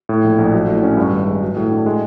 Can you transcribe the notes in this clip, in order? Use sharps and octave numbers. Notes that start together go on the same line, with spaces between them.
A2
A#1
A#1
F#3
A2
C#4
G2
G#1
G#3
F#3
A2
D4
G#3